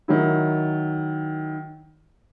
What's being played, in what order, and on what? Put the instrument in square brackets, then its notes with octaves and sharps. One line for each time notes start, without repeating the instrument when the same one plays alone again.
[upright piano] D#3 F#3 E4